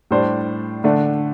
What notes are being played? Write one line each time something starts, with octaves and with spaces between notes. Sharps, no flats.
A2 G3 D4 C5
D3 A3 D4